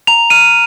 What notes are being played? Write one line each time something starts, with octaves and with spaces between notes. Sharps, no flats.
A#5 F7
F6 D#7